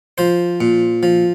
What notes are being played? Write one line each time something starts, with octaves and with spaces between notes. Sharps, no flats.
F3 C5
A#2
F3